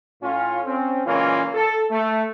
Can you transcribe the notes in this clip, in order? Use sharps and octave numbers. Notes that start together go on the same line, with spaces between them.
A2 C#4 F4
C4 C#4
C#2 A#2 E3 A#3 C#4 F4
A4
A3